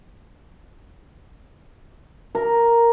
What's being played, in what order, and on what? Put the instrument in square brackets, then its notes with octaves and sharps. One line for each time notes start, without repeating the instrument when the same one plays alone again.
[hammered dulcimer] A#4